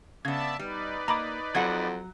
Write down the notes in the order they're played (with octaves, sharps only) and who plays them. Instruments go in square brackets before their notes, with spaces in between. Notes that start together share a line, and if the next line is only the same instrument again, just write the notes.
[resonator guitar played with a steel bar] C#3 B3 [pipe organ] D5 E5 A5 [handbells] G#6
[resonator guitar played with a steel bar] G3 [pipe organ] D#4 B4 D5
[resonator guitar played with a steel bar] A#3 D#5 [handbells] A#5 B5 D6
[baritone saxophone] F2 [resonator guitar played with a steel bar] F#3 F#5 [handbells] G#6